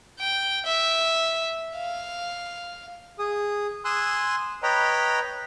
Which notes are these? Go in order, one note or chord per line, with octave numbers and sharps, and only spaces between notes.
G5
E5
F5
G#4 D#6
G#5 C6 D#6 E6 F#6
B4 C#5 D#5 G5 A#5 B5